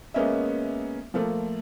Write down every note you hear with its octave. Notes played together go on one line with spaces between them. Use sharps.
G#3 A#3 B3 C#4 D#5 E5
F3 A3 A#3 F4